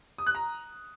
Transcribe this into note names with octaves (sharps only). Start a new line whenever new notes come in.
D#6
F#6
A#5